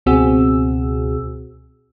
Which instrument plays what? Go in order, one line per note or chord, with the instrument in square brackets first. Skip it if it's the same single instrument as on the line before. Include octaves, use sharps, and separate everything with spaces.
[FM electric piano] C#2 B2 C4 F#4 G#4 E6